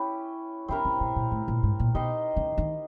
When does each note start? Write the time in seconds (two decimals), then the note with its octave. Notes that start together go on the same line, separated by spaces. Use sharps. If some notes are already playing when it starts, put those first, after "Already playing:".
Already playing: C#4 E4 G4 B4
0.68 D3 C4 E4 G4 A#4
0.85 C#3
1.00 B2
1.16 A#2
1.31 A2
1.48 A#2
1.63 G#2
1.80 A#2
1.94 B2 D#4 G4 C5 D#5
2.37 C#3
2.58 D#3